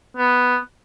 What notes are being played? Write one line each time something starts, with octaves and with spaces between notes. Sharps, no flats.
B3